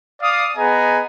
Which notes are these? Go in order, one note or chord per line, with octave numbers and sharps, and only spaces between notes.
D5 F5 D#6
B3 G#4 D#5 G#5 A#5